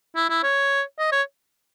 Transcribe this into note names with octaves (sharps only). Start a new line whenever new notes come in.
E4
E4
C#5
D#5
C#5